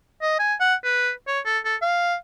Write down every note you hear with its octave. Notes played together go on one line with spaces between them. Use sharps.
D#5
G#5
F#5
B4
C#5
A4
A4
F5